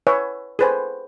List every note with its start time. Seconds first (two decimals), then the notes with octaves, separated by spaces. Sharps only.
0.07 B4 C#5 E5 G#5
0.59 G#4 A4 B4 C5 G#5